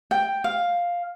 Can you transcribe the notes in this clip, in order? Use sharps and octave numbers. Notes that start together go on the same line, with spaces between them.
G5
F5